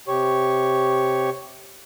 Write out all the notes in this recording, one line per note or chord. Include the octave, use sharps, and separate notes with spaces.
C3 G4 C#5 C#6